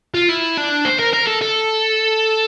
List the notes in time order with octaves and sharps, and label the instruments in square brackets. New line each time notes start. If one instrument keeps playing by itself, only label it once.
[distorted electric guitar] F4
E4
D4
C5
A#4
A#4
A4
A4